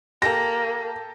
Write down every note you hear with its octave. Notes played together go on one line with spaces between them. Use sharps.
A#3 G4 A4 A5 A#6